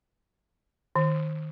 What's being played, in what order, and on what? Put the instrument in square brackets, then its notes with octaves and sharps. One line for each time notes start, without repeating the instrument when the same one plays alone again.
[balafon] D#3